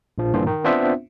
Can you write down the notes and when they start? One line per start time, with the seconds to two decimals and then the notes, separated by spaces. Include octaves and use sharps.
0.18 A#1 F3
0.34 G2 A#2 D3 E3 F3 F4
0.46 D#3 D#4
0.64 B3 C4 D4 F4 C5 E5